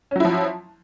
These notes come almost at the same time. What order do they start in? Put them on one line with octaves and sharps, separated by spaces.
C#4 F#3 E4 F3